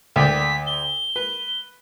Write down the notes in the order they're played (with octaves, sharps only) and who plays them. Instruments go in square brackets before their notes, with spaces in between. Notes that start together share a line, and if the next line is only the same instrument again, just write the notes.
[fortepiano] D2 D5 G5 [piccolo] B6
[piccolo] G7
[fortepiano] B4